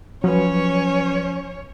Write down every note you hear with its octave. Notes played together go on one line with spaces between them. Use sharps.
F3 F#3 C#4 B4 C#5